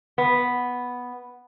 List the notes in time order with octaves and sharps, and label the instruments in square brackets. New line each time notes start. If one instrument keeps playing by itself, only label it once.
[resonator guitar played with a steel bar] B3